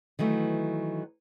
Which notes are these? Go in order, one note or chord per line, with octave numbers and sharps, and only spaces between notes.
D#3 E3 F#3 A3